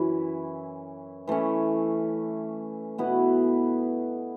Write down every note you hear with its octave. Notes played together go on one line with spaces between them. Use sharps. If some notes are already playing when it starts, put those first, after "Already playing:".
Already playing: F#2 E3 C#4 E4
E3 A3 C#4
B2 B3 E4 B4